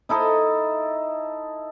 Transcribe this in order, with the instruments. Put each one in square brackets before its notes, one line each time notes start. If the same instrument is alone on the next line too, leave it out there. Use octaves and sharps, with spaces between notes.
[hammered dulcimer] D#4 E4 A4 D#5